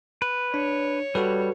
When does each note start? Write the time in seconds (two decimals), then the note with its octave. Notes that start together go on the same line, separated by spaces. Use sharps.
0.22 B4
0.54 D4 C#5
1.15 G3 F#4 A4 B4